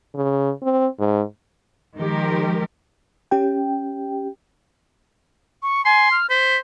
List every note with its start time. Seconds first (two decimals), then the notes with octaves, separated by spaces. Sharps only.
0.15 C#3
0.62 C4
0.99 G#2
1.98 D#3 F3 G#3 G4 A#4
3.31 C#4 G4 G5
5.63 C#6
5.85 G#5 C6
6.11 F6
6.30 C5 B6